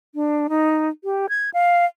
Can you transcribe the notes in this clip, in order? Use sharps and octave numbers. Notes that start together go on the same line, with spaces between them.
D4
D#4
G4
G#6
F5